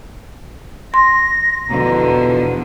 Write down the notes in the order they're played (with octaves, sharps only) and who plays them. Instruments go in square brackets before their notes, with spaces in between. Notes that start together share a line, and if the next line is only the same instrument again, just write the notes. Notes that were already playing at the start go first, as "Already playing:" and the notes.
[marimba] C6 [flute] A#6
[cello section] E2 D3 F3 [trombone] B2 [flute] A#5